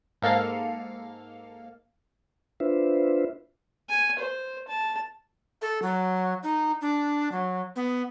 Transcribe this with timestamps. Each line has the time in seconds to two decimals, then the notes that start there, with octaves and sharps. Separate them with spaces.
0.22 G#2 A#3 A4 F5
2.60 D4 F4 B4 C5 E5
3.90 G#5
4.19 C5
4.68 A5
5.62 A4
5.82 F#3
6.43 D#4
6.81 D4
7.32 F#3
7.76 B3